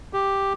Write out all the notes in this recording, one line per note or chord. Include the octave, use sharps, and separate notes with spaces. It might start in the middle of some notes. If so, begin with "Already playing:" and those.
G4